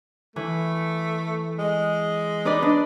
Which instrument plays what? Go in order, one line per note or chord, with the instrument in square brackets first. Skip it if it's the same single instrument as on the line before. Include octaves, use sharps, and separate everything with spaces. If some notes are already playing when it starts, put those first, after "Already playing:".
[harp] E3 [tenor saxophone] A3
[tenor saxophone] G#3
[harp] D#4 B4 D5
D4